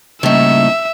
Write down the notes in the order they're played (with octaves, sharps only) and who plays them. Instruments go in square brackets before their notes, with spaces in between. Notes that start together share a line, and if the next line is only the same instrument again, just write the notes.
[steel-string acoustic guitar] A2 D#4 [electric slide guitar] C#3 G3 A#3 [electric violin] E5